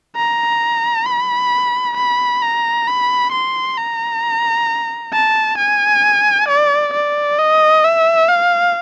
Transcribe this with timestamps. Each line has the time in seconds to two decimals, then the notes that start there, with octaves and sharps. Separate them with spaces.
0.16 A#5
1.06 B5
1.96 B5
2.42 A#5
2.87 B5
3.32 C6
3.77 A#5
5.13 A5
5.58 G#5
6.48 D5
6.93 D5
7.39 D#5
7.84 E5
8.28 F5